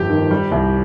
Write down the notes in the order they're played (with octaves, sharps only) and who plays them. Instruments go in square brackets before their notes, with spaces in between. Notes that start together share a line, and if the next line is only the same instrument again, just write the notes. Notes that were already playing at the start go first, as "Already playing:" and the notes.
Already playing: [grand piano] G1 F2 [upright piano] G4
[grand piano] D#3
G3
C2